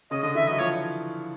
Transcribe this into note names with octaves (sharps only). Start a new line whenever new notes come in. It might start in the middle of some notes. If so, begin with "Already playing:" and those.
C#3 C#4 D#5
D3 D4 D#5
E3 E4 E5
F#3 F#4 D#5
F3 F4 C#5